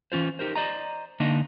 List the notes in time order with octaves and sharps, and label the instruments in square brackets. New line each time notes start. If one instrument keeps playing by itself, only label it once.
[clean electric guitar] E3 C#4 F4 C5
D#4 G4 A#4 C5
C5 D5 D#5 A#5
D3 A#3 D4 D#4 D#5